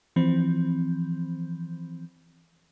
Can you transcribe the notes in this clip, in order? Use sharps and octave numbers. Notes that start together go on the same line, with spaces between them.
E3 F3 C4